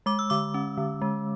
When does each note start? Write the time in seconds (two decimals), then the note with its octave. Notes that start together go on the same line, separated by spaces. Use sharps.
0.06 G#3 D6
0.19 E6
0.30 D3 D6
0.54 C#4
0.78 D3
1.02 G#3